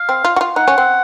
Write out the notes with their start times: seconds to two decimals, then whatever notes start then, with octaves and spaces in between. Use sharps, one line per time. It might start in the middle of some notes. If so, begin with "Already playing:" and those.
Already playing: F5
0.09 C4
0.24 F4
0.36 F#4
0.41 F4
0.56 D#4 F#5
0.68 C#4
0.78 C4